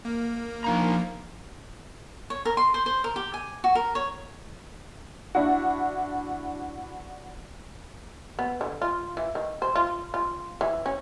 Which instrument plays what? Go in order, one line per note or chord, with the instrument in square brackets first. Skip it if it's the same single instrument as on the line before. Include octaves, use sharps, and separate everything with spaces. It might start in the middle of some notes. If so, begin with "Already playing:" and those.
[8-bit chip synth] A#3
[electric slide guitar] F3 D4 A#5 [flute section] D#4 A#4 F5
[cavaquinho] C#5
A#4
C6
C5
C5
A#4
G4
G#5
F#4
A#4
C#5
[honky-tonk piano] D4 E4 F#4
[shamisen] B3
D3
F4
E3
D#3
C5
F4
F4
E3
C#4